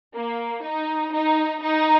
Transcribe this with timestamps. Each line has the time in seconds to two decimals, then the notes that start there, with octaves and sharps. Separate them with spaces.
0.15 A#3
0.64 D#4
1.13 D#4
1.62 D#4